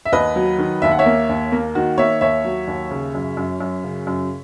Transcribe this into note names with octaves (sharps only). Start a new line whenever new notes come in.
E5
D#2 B4 D#5
F#3
D#3
D#2 E5
F#5
C#5 E5
A#3
D#2
A#3
D#3 F#4
A#3 C#5 E5
D#2 C#5 E5
F#3
D#2
C#3
F#2
F#2
F#2
C#3
F#2